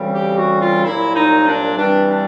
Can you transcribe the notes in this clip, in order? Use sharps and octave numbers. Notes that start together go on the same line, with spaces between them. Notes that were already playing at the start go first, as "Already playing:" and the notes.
Already playing: D2 C#3 E3 G3 C4
G4
F#4
F4
C2 A#2 F#3 E4
D#4
D4
G2 E3 G3 C4 D4
D4